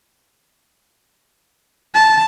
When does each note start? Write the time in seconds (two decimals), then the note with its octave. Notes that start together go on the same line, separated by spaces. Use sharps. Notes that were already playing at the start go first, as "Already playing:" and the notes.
1.95 A5